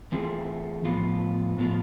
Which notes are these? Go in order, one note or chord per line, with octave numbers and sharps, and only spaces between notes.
E3 A3 C4 F4 G#4
A2 F3 B3 F4
A2 F3 B3 F4